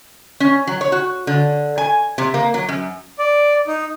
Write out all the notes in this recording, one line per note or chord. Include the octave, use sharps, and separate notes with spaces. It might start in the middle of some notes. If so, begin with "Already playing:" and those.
C#4
F#3
C#5
F#4
D3
G#5
C3
A#3
F#3
F#2
D5
D#4